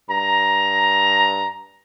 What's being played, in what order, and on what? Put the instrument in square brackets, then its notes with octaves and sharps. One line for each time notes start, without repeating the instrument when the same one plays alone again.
[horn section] G2 A#5